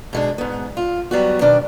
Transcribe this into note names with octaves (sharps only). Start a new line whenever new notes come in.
B2 G#3 D4
G#2 B3
F4
F#3 G3 B3 F#4
B2 D#3 D4 D5